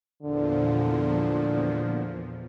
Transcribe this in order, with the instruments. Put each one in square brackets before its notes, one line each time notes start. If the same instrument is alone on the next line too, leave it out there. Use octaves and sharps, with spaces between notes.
[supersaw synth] E2 A#2 F3 [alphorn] D3